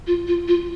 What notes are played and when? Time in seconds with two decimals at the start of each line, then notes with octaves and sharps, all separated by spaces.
0.07 F4
0.27 F4
0.48 F4